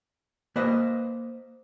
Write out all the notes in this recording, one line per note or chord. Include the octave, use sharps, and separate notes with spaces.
A#3 B4 C5 D#5